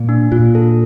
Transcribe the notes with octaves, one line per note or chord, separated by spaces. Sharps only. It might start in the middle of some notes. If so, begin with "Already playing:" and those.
Already playing: A#2
D4
A#2 F4
A4